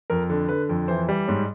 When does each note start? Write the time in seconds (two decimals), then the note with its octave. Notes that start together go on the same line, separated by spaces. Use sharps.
0.10 F2 A#4
0.30 D3
0.49 D3 B4
0.69 F2
0.88 E3 C5
1.09 G3
1.28 G#2 C#5